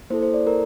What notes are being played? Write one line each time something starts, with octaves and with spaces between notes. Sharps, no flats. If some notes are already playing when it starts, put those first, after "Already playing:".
A#3 E4 A4 C5
C5
D5
A#4